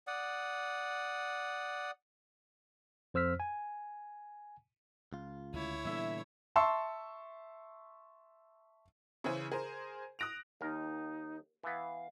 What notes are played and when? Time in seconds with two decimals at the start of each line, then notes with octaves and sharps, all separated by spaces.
0.07 D5 F#5 D#6
3.14 F2 C5 E6 F6 B6
3.40 G#5
5.13 C#2 F4
5.53 D2 E4 C#5
5.85 A#2 D3 E3 G3 B3 E5
6.56 E5 A5 C6 C#6 E6
9.24 C#3 E3 E4 G#4 C5
9.52 G#4 A#4 C5
10.19 D#6 F#6 A#6 D7 F7
10.61 D#2 D#4 A#4
11.64 E3 B3 F5